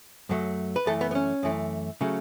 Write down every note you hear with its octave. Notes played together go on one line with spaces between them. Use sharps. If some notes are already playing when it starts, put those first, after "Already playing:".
F#2 F#3 A3
B4
F#2 E3 A3 A4
B3
B3
C#4
F#2 E3 A3
C#3 F#3 A3